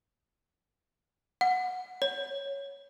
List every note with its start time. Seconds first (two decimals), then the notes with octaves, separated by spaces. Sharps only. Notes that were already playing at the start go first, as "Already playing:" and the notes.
1.41 F#5
2.02 C#5